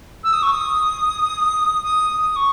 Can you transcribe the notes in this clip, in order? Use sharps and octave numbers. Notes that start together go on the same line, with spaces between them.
E6
D#6
C#6
D#6
D#6
D#6
C#6